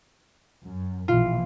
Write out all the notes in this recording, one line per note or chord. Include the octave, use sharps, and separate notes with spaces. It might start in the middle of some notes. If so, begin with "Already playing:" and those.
F#2
A#1 B2 E3 F4